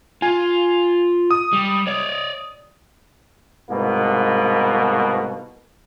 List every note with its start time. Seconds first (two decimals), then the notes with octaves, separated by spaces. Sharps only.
0.22 F4 G#5
1.31 D#6
1.53 G3
1.87 C#5 D5
3.70 C2 G#2 B2 A#3 B3